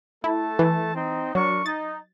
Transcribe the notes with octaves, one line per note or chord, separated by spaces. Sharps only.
A3 E4 A4 A5
E3
C4 D#4
F#3 D4 A#4 C#6
D#4 A6